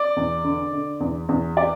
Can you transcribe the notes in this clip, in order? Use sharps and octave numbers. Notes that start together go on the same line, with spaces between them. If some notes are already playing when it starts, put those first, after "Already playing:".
Already playing: D5
E2
D3
D3
E2
E2
D5